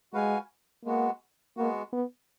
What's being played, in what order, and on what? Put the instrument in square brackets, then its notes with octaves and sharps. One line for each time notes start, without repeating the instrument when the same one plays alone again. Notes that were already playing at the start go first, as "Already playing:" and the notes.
[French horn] G#3 [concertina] F#4 B4 F5 G#5
[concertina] G#3 B3 F#4 [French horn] A#3
[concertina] G#3 B3 F#4 [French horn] A#3
[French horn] B3